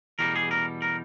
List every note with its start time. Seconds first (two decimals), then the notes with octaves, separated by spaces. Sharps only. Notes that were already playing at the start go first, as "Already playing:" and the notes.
0.19 E2 B2 G3 A#4
0.35 G#4
0.51 A#4
0.82 A#4